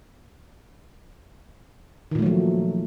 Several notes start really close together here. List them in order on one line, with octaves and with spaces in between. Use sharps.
D#3 A#2 A3 F#3 F3